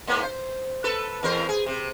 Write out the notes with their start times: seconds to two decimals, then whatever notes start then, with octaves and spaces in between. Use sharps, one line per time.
0.07 G#2 A#3 B3
0.23 C5
0.84 A4 B4
1.23 E2 A#4 C5
1.49 G#4
1.66 C3